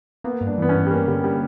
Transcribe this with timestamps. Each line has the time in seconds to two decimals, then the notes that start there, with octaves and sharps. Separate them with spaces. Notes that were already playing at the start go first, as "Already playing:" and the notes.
0.24 A#3 B3
0.41 G2
0.47 D4
0.58 E3 B3
0.69 C#4
0.75 G2
0.87 G3
0.91 A#3 C#4
1.08 D3 G3
1.24 G3 A#3